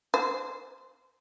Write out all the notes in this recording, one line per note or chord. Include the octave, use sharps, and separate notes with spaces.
C5